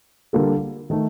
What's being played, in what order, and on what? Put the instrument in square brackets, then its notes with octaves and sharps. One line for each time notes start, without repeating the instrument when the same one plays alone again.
[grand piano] D3 G3 A#3 F4 A4
D#3 A3